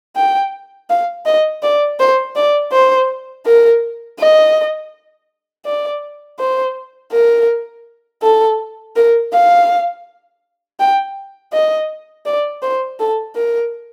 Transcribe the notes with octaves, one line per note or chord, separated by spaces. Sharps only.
G5
F5
D#5
D5
C5
D5
C5
A#4
D#5
D5
C5
A#4
A4
A#4
F5
G5
D#5
D5
C5
A4
A#4